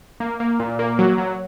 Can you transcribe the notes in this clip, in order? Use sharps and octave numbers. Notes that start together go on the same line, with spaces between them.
A#3
A#3
A#2
A#3
F#3
F#3